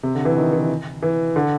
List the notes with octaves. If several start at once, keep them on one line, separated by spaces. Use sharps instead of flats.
C3
D3
E3
D#3
E3
E3
D3